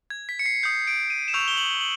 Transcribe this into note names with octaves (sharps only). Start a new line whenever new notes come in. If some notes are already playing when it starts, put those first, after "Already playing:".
G#6
B6
C#7
C7
D#6 G6 C7
D7
D#7
E7
C#6 E6 G6 F7
G7
F#7
F#7